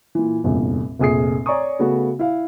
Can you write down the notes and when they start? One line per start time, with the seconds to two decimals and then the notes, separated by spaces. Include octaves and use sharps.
0.15 A#2 E3
0.44 F1 A#1 E2 G2
0.99 F1 A#1 G#4 D#6 C7
1.46 C#5 D5 G#5 A#5 C#6 D#6
1.79 C#3 A3 B3 F#4
2.19 E4 F5